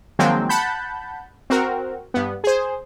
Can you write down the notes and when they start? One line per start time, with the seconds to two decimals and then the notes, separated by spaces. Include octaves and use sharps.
0.19 D#3 F3 F#3 G#3 A#3 C4
0.49 F#5 A5 B5 G6
1.50 C4 F#4 A#4
2.14 G2 B3
2.44 G#4 C5